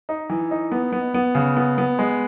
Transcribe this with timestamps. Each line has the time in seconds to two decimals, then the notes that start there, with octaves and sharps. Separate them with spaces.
0.09 D#4
0.30 E3
0.51 D#4
0.72 B3
0.93 B3
1.14 B3
1.35 C#3
1.57 B3
1.78 B3
1.99 G#3